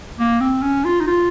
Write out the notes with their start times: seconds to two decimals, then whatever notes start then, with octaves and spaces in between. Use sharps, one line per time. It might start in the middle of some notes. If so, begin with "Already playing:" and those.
0.19 A#3
0.40 C4
0.62 C#4
0.84 F4
1.00 D#4
1.07 F4